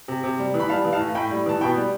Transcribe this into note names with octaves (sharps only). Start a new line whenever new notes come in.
C3
C3
G3
E3
B5
G3 F5 A5
E3
F5 A5
A2
A2 G5 B5
G3
E3 A5
B2 G5 B5
G3